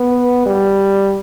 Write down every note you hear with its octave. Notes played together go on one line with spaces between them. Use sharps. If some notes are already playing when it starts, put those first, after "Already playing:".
Already playing: B3
G3